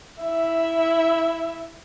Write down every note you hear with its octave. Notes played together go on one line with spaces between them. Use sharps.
E4 E5